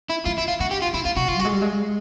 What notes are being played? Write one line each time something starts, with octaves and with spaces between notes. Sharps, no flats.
E4
D#3 F4
E4
F4
D3 F#4
G4
F4
C#3 E4
D3 F4
C3 F#4
C#3 F4
G3 F#4
G#3
G3
G#3